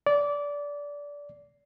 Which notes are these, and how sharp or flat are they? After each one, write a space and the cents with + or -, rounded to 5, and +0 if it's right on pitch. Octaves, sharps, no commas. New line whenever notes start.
D5 -20